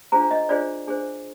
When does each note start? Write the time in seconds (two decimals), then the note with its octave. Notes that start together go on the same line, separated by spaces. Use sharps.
0.12 D4 F4 G#4 C5 A#5
0.31 D#5
0.49 D4 F4 G#4 C5 D5
0.87 D4 G#4 C5